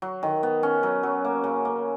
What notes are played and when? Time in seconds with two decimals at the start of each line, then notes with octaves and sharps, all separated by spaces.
0.02 F#3
0.23 D#3
0.43 B3
0.63 C#4
0.83 F#3
1.03 F#3
1.25 A#3
1.44 C#3
1.65 A#3